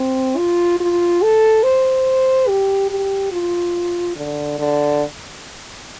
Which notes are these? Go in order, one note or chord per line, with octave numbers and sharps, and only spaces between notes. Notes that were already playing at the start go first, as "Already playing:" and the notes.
Already playing: C4
F4
F4
A4
C5
G4
G4
F4
D3
D3